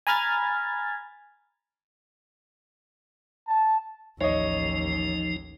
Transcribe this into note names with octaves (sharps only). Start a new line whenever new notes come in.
G#5 A#5 B5 F6 G#6 A6
A5
A1 D#2 F3 D#4 C#5 D#5